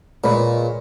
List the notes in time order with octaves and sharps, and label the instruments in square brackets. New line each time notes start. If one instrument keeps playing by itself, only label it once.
[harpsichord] A#2 [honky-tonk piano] G#3 B4 C#5 [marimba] D5 B5